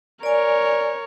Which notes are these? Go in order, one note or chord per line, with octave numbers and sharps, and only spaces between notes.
A#4 C#5 D5 G#5